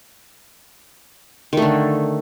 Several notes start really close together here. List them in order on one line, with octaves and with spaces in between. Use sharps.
D#3 A3 D3